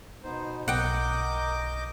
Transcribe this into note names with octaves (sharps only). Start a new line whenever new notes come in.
B2 B3 D#4 C5
B1 A#4 D#5 F#5 G5 D6 G6